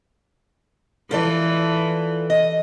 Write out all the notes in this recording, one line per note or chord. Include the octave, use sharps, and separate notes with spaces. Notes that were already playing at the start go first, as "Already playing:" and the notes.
E3 F4 A4 D5
D#5